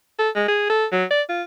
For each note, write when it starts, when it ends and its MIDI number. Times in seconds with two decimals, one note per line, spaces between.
0.18 0.29 69
0.35 0.45 56
0.48 0.68 68
0.69 0.85 69
0.92 1.04 54
1.10 1.22 74
1.29 1.42 65